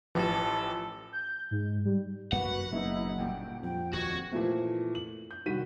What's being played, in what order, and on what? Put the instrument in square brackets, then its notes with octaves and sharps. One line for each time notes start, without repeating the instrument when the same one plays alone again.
[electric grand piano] A1 E3 [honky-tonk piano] F3 G4 [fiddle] A4
[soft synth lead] G6
G#2
G3
[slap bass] F#2 A#3 [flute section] F#4 B4 [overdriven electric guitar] F#5
[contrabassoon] F#1 [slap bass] B2 [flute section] D#4 E4
[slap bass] D2 A#2 G3 [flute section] G5
[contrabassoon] F2 [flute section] G5
[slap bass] D#1 D#2 [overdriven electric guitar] F#4 [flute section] G#6
[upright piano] A#2 E3 F3 A3 C4
F#7
G6
C2 D#3 F#4 B6 D#7